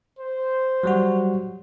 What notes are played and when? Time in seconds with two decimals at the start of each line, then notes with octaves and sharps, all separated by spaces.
0.19 C5
0.83 F#3 G3 F#4